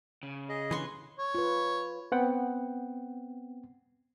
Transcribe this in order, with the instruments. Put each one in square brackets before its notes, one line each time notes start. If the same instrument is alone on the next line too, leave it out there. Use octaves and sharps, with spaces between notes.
[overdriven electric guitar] C#3
[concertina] G#4 D#5
[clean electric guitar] D3 E3 [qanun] B4 C6 C#6
[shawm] C#5
[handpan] F4 B4
[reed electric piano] B3 C4 F#5 G5